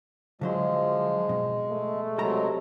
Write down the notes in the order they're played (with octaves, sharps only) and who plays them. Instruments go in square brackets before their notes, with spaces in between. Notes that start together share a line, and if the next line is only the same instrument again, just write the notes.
[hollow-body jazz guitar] D3 F#3 C5 [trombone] F3 [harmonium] G#3
[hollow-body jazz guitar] B2
[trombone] A3
[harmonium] C3 F#3 G#3 [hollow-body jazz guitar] A4 A#5